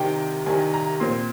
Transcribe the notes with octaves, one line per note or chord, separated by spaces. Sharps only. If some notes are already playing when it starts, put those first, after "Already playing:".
Already playing: C2 C3 D#3 G5
C2 C3 D#3 G#5
A#5
A#2 F3 C4 C6